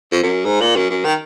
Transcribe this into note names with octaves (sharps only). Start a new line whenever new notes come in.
F2
F#2
G#2
A#2
F#2
F#2
D#3